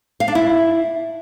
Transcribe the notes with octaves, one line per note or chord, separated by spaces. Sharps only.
F5
D4
E4